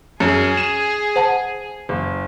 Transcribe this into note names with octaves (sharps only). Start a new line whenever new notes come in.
F#2 G#4
E7
C5 F#5 A5
F#1